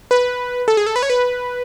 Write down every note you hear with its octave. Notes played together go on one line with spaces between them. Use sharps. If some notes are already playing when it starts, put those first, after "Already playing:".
B4
A4
G#4
A4
B4
C#5
B4